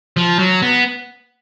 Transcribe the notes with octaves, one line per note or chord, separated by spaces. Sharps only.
F3
F#3
B3